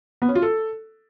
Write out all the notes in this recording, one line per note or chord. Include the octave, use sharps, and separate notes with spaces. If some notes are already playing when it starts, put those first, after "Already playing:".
B3
C#4
F4
A4